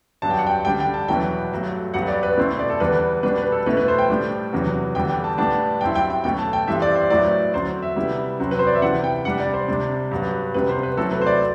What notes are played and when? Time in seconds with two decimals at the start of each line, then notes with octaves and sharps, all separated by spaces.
0.22 G2 F#3 B3 D4 A5
0.30 G5
0.38 F#5
0.47 G5
0.65 D3 G3 D4 G5
0.80 G5
0.94 A5
1.08 E2 B2 F#3 B3 E4 G5
1.51 G2 F#3 A3
1.94 G2 F#3 B3 F#5
2.08 D5
2.23 B4
2.37 B2 A3 C4 E4
2.59 D5
2.70 A4
2.80 E2 D3 G3 D4 B4
3.23 B2 G3 D4 B4
3.38 B4
3.52 A4
3.66 B2 A3 E4 B4
3.77 B4
3.88 C5
3.98 G5
4.09 A2 G3 D4
4.53 E2 C3 F#3 B3
4.95 E2 D3 G3 B3 G5
5.09 G5
5.24 A5
5.38 A2 G3 B3 D4 A5
5.81 G2 F#3 C4 E4 G5
5.95 G5
6.10 G5
6.24 B2 F#3 A3 G5
6.39 A5
6.53 G5
6.67 G2 E3 G3 C4 E5
6.82 D5
6.95 C5
7.10 A2 F#3 B3 E4 D5
7.54 D3 F#3 C4 C5
7.82 E5
7.96 C3 G3 B3 E4
8.40 C3 F#3 C4
8.51 B4
8.59 C5
8.67 D5
8.75 E5
8.82 C3 E3 B3 E4 F#5
9.04 G5
9.25 C3 G3 D4 F#5
9.40 D5
9.54 C5
9.68 C3 G3 D4
10.11 G2 F#3 B3
10.54 C3 G3 B3 B4
10.69 C5
10.83 B4
10.97 C3 F#3 A3 E4 A4
11.11 B4
11.21 C5
11.26 D5